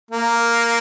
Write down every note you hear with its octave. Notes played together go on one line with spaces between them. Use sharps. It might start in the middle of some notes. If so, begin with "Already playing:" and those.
A#3